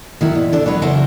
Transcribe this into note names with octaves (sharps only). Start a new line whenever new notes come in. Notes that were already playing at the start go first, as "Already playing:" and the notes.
D#3 F#3 E4
A#2
D3 D4 A4
D2 F#3 B4 C#5
C#3 F#3 E4 C5